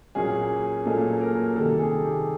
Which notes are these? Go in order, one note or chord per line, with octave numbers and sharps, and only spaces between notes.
A#2 F#3 A#3 C#4 G#4
A#2 F#3 A#3 C#4 A4
A#4
C3 D#3 G3 A4
G#4
G4